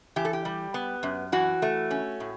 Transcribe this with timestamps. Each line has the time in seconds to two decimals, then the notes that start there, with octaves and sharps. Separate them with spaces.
0.16 E3 G4
0.25 A4
0.33 G4
0.45 G3
0.74 B3
1.03 F#2
1.32 E3 F#4
1.62 A3
1.91 C#4
2.20 A2